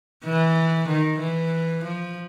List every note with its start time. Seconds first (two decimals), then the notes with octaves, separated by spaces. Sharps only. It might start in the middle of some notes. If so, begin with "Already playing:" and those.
0.25 E3
0.88 D#3
1.20 E3
1.84 F3